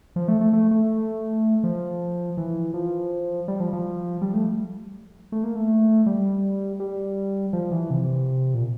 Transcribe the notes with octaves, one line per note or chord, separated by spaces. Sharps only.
F3
A3
A3
A3
A3
F3
E3
F3
G3
F3
F3
G3
A3
A3
A#3
A3
G3
G3
F3
E3
C3
A#2